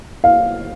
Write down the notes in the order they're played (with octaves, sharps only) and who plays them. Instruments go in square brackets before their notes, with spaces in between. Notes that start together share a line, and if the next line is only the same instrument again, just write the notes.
[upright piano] F5